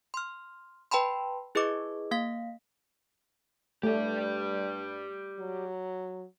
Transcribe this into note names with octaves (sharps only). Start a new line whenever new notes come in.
C6 F6
B4 G5 A5 B5 C6
E4 G#4 B4 D#5 D6
A#3 F5 B6
G2 A3 G4 D5
F#3